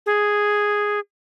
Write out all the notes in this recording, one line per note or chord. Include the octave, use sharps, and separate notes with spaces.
G#4